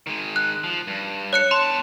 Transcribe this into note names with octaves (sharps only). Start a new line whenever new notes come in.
D#3 G#3
F#6
F3
G2
C#5 F#6 C#7
E2 A5 C6